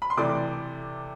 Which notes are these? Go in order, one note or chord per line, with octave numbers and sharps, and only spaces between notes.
B5
C6
C3 E3 A3 D5 D6